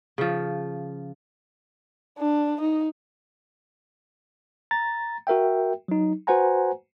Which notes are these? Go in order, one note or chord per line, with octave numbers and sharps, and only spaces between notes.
C#3 F3
D4
D#4
A#5 A6
F#4 A#4 E5 G5
F#3 D#4
F#4 B4 C5 F#5 G#5 A#5